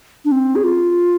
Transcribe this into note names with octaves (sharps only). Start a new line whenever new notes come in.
D4
C4
G#4
F4